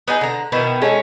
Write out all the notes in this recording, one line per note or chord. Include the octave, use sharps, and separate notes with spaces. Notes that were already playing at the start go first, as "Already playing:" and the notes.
B3 D#4 G#4
D3 A#5
B2 D#3 B3 E4
D#3 G#3 A3 C#4